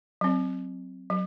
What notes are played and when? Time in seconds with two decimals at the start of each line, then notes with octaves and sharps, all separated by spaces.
0.21 F#3 C4
1.10 F#3